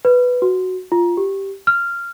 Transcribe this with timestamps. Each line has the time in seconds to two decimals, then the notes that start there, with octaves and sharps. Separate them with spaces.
0.05 B4
0.42 F#4
0.92 F4
1.17 G4
1.67 F6